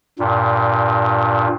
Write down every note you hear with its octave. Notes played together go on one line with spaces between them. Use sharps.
G2 A#2